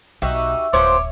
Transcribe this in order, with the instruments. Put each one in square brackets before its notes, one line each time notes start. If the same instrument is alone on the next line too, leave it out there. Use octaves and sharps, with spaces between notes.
[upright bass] B1 [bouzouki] D#4 F#4 G4 [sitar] E5
[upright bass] D1 F#2 [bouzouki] F3 B3 C5 [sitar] C#5 [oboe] D6